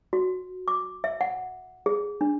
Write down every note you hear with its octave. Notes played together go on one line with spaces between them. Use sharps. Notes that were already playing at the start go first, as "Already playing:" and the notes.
F#4
D6
E5
F#5
G#4
D4